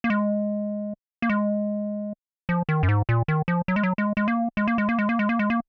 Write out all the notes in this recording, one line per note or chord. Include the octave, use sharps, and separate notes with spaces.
A#3
G#3
A#3
G#3
F3
D#3
F#2
G#2
A#2
D#3
F3
F#3
G#3
F#3
G#3
G#3
A#3
G#3
A#3
G#3
A#3
G#3
A#3
G#3
A#3
G#3
A#3